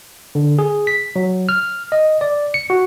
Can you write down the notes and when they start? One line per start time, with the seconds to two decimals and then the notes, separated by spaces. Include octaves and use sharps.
0.35 D3
0.59 G#4
0.87 B6
1.16 F#3
1.49 F6
1.92 D#5
2.21 D5
2.54 C#7
2.70 F#4